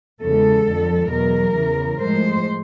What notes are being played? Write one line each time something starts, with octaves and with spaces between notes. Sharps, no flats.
E2 C#3 E3 G#3 A4
F2 D3 F3
E2 B2 F#3 A#4
E2 C#3 E3
A2 F3 G#3 C5